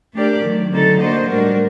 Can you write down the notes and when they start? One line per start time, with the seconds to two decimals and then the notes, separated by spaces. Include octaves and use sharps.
0.14 A3 D4 G4 A#4 D5
0.44 D#3 F#3 A3
0.72 D3 F#3 C4 D#4 A4
1.00 A#3 D4 F#4 C5 D#5
1.29 A2 G3 D4 F#4 A#4